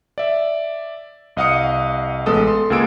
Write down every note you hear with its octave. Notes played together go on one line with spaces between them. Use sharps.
D5 E5
C2 D#5 F5 F#5 D#6 C#7
A1 G#3 B3 A4 D#6
A4 C6
C#2 A#3 G#4 E6 D7